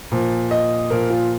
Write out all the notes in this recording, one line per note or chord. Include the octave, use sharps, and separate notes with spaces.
A#2 F3
D#5
A#2 F3 A#4
F4